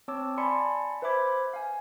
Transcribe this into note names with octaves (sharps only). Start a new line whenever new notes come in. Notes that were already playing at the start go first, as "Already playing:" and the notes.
C4 C#5 A5 D6 E6
D5 G#5 A5 B5 C6 C#7
B4 C5 E5 B5 D6 G#6
F5 G#5